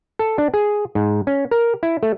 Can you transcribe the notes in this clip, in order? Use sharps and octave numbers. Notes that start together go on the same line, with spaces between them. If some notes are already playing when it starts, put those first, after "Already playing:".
A4
D4
G#4
G#2
C#4
A#4
E4
A3